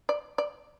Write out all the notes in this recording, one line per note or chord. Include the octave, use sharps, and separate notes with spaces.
D5
D5